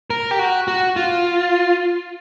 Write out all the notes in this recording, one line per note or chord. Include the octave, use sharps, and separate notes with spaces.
A#4
G4
F#4
F#4
F4